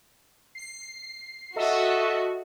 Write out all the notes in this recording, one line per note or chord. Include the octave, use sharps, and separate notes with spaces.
C7
F#4 A4 D#5 E5